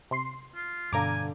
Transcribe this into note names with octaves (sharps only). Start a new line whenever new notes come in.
C3 C6 C7
F4
G2 B2 D3 A4 F5 G#5 A#5 D6